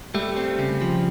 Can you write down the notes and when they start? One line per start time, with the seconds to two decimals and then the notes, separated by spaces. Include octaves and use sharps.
0.14 G3 A3
0.37 C4
0.59 C#3
0.82 F3